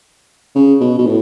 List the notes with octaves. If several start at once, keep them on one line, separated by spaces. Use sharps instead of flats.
C#3
B2
B2
A2